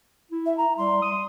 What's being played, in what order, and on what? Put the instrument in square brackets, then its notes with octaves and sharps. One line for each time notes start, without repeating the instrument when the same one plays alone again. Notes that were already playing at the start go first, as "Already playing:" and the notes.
[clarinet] E4
[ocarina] E5
A#5
[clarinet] G3 [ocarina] C6
[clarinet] D#6